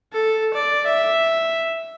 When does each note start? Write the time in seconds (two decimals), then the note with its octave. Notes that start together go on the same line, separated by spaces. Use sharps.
0.13 A4
0.54 D5
0.86 E5